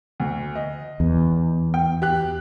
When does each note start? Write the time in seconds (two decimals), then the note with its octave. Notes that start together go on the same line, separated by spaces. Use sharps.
0.20 D2
0.55 D#5
1.00 E2
1.74 G5
2.02 G4 F#6